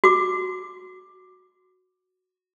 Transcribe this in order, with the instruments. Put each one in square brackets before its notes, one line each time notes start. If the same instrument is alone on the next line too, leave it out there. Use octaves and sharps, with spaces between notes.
[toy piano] F#4 D6